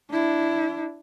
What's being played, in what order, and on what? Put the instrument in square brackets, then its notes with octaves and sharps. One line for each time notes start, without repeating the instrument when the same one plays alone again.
[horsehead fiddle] D4 E4